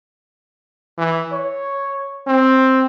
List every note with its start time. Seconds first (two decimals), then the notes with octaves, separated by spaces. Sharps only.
0.98 E3
1.32 C#5
2.27 C4